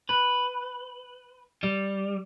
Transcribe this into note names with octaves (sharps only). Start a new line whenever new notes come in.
B4
G3